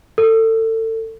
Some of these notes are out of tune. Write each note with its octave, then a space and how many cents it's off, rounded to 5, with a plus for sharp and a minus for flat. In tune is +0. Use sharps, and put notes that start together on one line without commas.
A4 +30